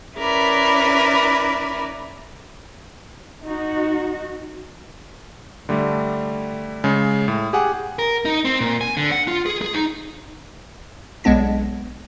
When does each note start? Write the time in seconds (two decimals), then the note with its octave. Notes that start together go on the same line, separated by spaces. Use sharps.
0.16 C#4 E4 A#4 B4 D5
3.47 D#4 F#4
5.69 D3 G3 A3
6.84 C#3 G#3
7.28 A2
7.53 G4 G#4 F#5 G#5
7.99 A#4
8.25 D#4
8.45 C4
8.60 A#2
8.81 G#5
8.97 D3
9.12 F#5
9.28 F4
9.46 G#4
9.61 G#4
9.74 D#4
11.24 B1 G#3 B3 D4 A#6